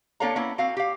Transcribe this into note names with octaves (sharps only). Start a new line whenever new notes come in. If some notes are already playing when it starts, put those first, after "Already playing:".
A#3 D4 A4 C#5 F5 A#5
A#3 B3 C#4 E4
C4 F#4 F5
G4 F5